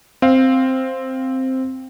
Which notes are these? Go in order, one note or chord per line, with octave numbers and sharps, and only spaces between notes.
C4 F5